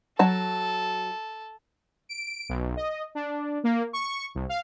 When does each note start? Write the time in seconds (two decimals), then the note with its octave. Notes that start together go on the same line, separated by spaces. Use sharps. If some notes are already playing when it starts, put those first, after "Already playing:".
0.19 F#3 A4 A5
2.09 D7
2.49 B1
2.77 D#5
3.15 D4
3.64 A#3
3.93 C#6
4.35 C2
4.49 F5